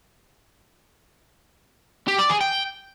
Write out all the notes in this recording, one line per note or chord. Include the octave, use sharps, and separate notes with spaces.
G4
D5
G#4
G5